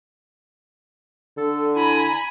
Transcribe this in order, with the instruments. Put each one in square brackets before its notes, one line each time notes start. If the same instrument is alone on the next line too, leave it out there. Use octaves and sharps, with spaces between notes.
[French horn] D3 [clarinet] A4
[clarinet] E4 [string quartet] G#5 A#5 B5